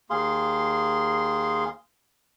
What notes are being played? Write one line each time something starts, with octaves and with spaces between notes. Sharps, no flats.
D#2 G#4 F5 C6